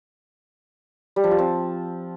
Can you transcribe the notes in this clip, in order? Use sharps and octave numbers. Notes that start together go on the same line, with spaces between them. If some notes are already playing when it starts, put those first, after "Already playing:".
G3
F3
F4
C4